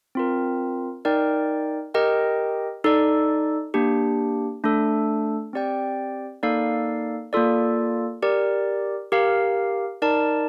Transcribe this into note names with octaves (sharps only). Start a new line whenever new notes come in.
C4 F4 A#4
D#4 A#4 D5 G5
G4 A#4 D#5 G5
D#4 A4 D5
A#3 D4 G4
A3 D4 A4
C4 G4 D5 G5
A#3 D#4 A4 D5 F5
A#3 F4 A4 D5
G4 A#4 D5
G4 A#4 F5
D#4 A#4 D5 A5